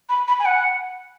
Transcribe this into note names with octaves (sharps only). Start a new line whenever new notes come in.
B5
B5
G#5
F#5